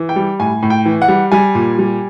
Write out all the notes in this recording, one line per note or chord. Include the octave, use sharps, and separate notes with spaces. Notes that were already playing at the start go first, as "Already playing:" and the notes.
Already playing: E3
G5
G3
A2 G#5
A2
G5
E3
F#5
G3
G3 G#5
A#2
G3